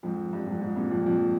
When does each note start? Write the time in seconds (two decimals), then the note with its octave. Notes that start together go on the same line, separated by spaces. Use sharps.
0.03 F2 G#2
0.33 G2
0.47 F2 G#2
0.61 F2 G#2
0.76 G2 A#2
0.91 F2
1.06 F2